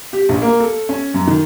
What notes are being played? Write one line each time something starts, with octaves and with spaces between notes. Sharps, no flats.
G4
A#1
A#3
A4
C#4
F#2
D#3